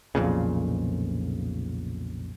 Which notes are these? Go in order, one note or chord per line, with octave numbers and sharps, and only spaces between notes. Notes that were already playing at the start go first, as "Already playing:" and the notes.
B1 F2 A#2 C#3